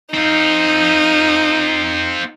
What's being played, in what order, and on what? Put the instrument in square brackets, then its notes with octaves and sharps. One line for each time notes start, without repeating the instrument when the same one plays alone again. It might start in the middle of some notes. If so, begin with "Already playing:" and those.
[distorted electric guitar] C4 F4 [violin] D#4